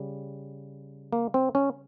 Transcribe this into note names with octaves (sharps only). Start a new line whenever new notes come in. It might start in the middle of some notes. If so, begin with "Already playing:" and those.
Already playing: C#3 G3
A#3
C4
C#4